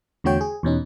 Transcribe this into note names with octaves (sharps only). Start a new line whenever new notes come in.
E2 D3 A3 F#4 C#5 G5
G#4
E2 B2 C#4 D#4